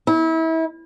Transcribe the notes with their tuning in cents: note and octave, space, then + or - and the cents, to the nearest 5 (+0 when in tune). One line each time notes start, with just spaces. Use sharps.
E4 -30